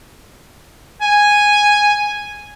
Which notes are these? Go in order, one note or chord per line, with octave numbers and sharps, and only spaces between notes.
G#5